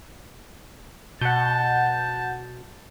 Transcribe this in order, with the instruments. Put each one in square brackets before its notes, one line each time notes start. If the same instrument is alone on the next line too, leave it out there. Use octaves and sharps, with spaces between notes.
[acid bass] B2 [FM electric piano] F#5 G6 [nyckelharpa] A5